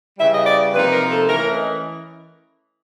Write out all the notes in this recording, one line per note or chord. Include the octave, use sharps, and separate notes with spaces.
C#3 E3 G3 E5
D#5
D5
C3 F3 A#3 D#4 B4
A#4
A4
E3 A3 C#4 A#4
D#5